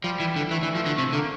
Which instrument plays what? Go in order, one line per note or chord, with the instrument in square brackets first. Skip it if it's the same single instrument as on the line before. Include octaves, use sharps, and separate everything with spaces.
[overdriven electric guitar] F3 [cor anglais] G3
[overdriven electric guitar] E3
D3
[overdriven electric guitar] E3 [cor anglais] A3
[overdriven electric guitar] E3
[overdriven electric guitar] F3 [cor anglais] A3
[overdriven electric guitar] D3
[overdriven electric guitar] C3 [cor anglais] A3
[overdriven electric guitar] D3 [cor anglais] A#3